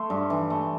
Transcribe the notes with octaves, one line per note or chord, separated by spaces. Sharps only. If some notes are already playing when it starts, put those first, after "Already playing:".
Already playing: A3 C6
G2
E3
A3